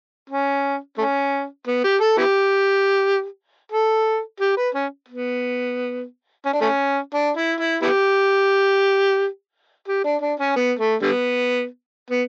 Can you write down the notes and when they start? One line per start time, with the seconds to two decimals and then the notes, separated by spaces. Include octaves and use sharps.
0.29 C#4
0.98 A3 C#4
1.67 B3
1.84 G4
2.01 A4
2.18 B3 E4 G4
3.72 A4
4.40 G4
4.57 B4
4.74 C#4
5.08 B3
6.45 C#4
6.53 D4
6.61 A3 C#4
7.14 D4
7.37 E4
7.60 E4
7.82 B3 E4 G4
9.88 G4
10.04 D4
10.22 D4
10.39 C#4
10.56 B3
10.79 A3
11.02 D3 G3 B3
12.10 B3